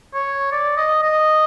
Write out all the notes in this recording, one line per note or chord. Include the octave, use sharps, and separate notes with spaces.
C#5
D5
D#5
D#5